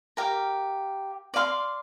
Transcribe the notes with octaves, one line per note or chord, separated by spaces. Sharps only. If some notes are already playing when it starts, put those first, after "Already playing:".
G4 A#4 F5
D5 F5 C6